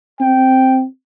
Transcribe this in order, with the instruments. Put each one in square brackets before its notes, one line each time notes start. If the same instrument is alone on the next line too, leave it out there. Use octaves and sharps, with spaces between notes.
[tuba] C4 [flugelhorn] G5